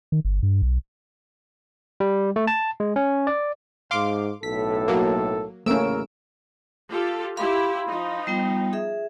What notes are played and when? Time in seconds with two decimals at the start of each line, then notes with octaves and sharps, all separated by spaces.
0.12 D#3
0.25 G1
0.43 G2
0.62 B1
2.00 G3
2.36 A3
2.47 A5
2.80 G#3
2.96 C#4
3.27 D5
3.91 G#2 F5 C6 D6
4.43 B1 A2 A4 B6
4.88 F#3 A#3
5.66 A1 C#3 A3 A#3 C#4 A#4 E6 D7
6.89 F4 G4 A4
7.37 E4 G4 F5 B5 C6
7.88 F3 D#4
8.27 G3 B3 G5
8.73 G#4 E5